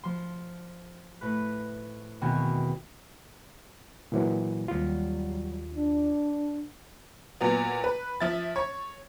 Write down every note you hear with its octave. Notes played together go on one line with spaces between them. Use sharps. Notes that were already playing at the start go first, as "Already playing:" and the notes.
F3 C6
A2 B4
E2 B2 D#3 C4 F#4 C#5
A#2 E3 F#3
D#2 F#3 G3 F4
D4
A#2 F#3 B3
B4
F3 E5 A6
C#5